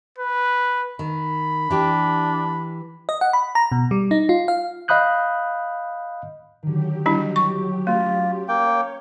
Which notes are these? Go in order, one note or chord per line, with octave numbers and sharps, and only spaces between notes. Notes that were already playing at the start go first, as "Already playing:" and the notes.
B4
D#3 B5
E3 D4 G4
D#5
F#5
B5
A#5
B2
G3
D#4
F4
F5
D#5 F5 B5 D#6 F#6 G6
D3 D#3 F#3 G4
G3 D4 E4
C#6
A3 C#4 F4 B5 B6
A#3 C#5 G5